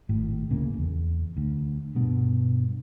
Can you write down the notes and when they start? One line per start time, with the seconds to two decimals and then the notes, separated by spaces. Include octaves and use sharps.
0.09 G#1 A2
0.50 D1 C#3 A#3
0.79 E2
1.37 D2
1.95 G2 B2